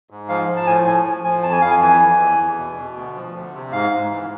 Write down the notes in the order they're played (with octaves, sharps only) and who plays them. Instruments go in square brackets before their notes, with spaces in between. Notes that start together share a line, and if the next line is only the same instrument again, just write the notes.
[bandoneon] G#2
F3 F5
F3
A5
A2 G#5
A2 G#5
F3
F3 G#5
F2 A5
G#5
F2 F5
G#5
E3 G#5
E3
E2
E2
B2
B2
D2
F3
D2
C3
G#2 F5
G#2
E3